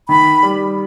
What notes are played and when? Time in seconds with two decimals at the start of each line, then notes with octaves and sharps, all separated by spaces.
0.09 D#3 B5
0.43 G3